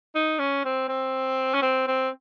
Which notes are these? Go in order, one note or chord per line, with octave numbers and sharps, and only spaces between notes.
D#4
C#4
C4
C4
C#4
C4
C4